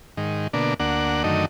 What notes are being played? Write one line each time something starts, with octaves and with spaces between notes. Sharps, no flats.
G#2 D#3
B2 D3 A#3 D4
D2 A#3 D4 F#5
F#2 D3 D#3 A3 D#4